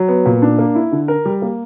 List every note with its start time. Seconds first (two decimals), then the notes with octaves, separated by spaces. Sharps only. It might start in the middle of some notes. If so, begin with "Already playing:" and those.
Already playing: F#3
0.08 B3
0.26 A#2
0.42 D4
0.59 A#3
0.75 E4
0.92 D3
1.08 A#4
1.25 G3
1.42 A#3